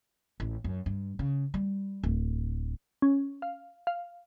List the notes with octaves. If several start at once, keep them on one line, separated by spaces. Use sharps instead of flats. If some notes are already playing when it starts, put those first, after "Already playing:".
A1
F#2
G2
C#3
G3
D1
C#4
F5
F5